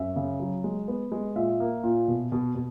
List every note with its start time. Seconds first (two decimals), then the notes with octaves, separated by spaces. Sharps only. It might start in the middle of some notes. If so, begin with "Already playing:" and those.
Already playing: F#2 E5
0.16 C#3
0.40 F#3
0.64 G#3
0.88 B3
1.12 G#3
1.36 A#2 E5
1.60 A#3
1.83 A#2
2.08 B2
2.32 B2
2.55 B2